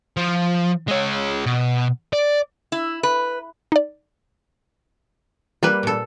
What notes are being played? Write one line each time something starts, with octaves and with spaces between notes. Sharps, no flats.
F3
G#3 C#5
B2
D5
E4
B4
D#4 D5
G3 A#3 F4 B4
A#2 A4